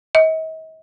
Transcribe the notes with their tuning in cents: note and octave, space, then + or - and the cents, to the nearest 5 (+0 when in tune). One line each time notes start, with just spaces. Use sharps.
D#5 +45